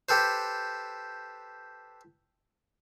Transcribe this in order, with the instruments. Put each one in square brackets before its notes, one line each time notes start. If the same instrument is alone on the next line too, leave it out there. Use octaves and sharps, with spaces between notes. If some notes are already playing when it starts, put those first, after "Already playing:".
[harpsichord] G4 A4 B4 C5